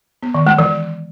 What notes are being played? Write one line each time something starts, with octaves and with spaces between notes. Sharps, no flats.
B3
D#3
G#3
E3